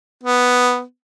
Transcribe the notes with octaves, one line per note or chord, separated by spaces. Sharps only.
B3